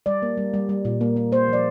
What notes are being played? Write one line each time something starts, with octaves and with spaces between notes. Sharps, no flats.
G3 D5
A#3
G3
G3
G3
A#2
A#3
A#3
A#3 C5
F3 D5